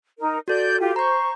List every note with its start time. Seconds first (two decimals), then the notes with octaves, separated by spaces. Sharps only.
0.20 D#4 A#4
0.48 F#4 A4 D5 G6
0.80 F4 G4
0.96 C5 A#5 C#6 G6